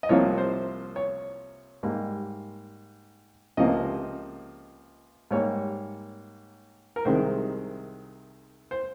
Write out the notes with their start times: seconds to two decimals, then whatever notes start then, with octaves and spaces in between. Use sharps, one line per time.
0.03 D#5
0.09 C2 C3 F3 A#3 C#5
0.38 C5
0.96 C#5
1.83 G#2 G3 A#3
3.57 C#2 C3 F3 A#3 D#5
5.31 G#2 G3 A#3 C#5
6.96 A#4
7.05 C2 C3 D#3 G#3 C5
8.71 C5